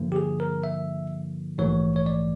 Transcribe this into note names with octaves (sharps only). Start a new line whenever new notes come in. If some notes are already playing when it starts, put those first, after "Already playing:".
Already playing: G2 D3 F3 A#3
G4
G#4
A#4
E5
A#1 G#2 E3 A3 C#5
C#5
D5